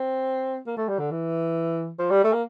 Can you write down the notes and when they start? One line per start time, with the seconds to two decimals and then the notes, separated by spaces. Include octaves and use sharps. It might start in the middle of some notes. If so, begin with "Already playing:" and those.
Already playing: C4
0.67 A#3
0.77 A3
0.89 G3
0.99 D3
1.11 E3
1.99 F3
2.11 G3
2.24 A3
2.33 A#3